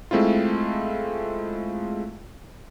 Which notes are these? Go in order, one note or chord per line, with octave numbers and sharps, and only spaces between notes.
G#3 A3 C4 E4 F4